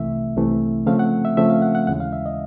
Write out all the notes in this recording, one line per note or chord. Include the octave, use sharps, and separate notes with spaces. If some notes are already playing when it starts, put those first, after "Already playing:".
Already playing: C2 C3 E3 A3 E5
C2 C3 E3 A3
C#3 F3 A3 C4 F5
F#5
E5
C#3 F3 A3 C4 E5
F5
F#5
F#5
D#2 C#3 E3 G#3 F#5
F5
E5
D#5